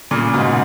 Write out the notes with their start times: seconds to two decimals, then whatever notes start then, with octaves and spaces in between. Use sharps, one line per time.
0.11 A#2 C#3
0.33 G#2 B2